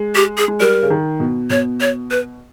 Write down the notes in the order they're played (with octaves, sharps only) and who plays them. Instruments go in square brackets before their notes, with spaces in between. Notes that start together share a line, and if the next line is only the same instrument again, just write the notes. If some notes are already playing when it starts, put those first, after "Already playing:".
Already playing: [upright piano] G#3
[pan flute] G4
G#4
[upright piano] G#3
[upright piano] G3 [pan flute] A#4
[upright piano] C#3
D#3
B2
[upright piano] B2 [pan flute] C#5
[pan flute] C#5
B4